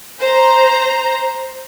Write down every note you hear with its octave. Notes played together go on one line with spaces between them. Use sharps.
C5 A#5